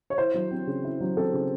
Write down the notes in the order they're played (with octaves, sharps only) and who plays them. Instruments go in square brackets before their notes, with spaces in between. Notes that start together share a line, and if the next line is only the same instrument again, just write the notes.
[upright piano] C#5
E4 C5
F#3
C4
C#3
E4
F#3
C4 A4
C#3